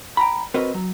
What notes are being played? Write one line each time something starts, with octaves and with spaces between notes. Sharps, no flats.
G5 A#5 B5
C4 F#4 A#4 B4 D#5
F#3